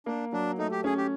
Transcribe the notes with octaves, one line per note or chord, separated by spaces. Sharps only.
A#3 D4
F#3 D4
A3 D#4
G4
C#4 G#4
G4